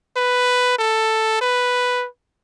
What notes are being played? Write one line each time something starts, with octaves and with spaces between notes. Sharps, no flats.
B4
A4
B4